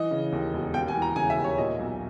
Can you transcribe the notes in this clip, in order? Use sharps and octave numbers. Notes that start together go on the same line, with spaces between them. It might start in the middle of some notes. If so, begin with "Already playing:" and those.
Already playing: E3 D#5
C#3
D#2
E1
D#2 G5
G#5
E3
A#5
C#3 G#5
E5
D#2
C#5
A#2 D#5
B1